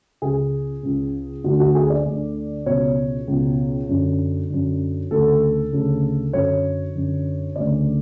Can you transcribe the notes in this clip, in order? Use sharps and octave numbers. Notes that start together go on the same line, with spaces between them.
C#2 C#3 G#4
C#2 C#3
D2 D3 F#4
F#4
G#4
D5
D2 D3
C#2 B2 C#5
C#2 B2
F#2 D3
F#2 D3
D2 C#3 A4
D2 C#3
F#2 D3 C#5
F#2 D3
D2 C#3 D5